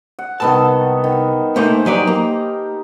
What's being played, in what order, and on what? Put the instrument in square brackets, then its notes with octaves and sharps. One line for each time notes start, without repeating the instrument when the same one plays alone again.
[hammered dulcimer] F#5
[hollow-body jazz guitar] C2 G2 A5 [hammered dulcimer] D#3 B3 A4
[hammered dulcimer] D#3
[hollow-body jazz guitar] A3 A#3 D#4 [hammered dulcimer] C5 G#5
[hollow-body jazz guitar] F#3 B4 D5 [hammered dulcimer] D#4 G4
[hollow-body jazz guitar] A#3